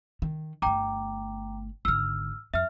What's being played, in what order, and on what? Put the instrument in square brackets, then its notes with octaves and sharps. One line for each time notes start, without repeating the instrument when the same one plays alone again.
[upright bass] D#3
[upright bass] G1 A3 [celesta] G5 A#5 D6
[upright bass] G#1 D3 [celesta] E6 F6
[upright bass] F2 [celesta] E5 F6